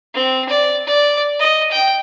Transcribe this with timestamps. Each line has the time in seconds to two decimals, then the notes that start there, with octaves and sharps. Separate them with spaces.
0.14 C4
0.49 D5
0.87 D5
1.39 D#5
1.72 G5